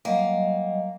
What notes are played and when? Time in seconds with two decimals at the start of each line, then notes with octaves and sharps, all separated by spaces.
0.05 F#3 G3 A#3 D#5